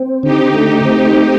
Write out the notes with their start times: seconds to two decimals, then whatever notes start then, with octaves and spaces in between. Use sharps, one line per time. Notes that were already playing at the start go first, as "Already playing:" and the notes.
Already playing: C4
0.23 D3 D#4 G4
0.55 A3
0.85 C4
1.17 A3